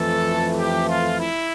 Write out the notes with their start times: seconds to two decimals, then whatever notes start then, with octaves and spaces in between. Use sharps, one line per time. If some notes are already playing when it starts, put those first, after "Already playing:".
Already playing: F2 E3 A3 A4
0.56 G4
0.87 F4
1.18 E4